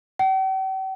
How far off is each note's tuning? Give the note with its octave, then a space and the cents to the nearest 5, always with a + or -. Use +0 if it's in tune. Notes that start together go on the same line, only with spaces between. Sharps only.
G5 -45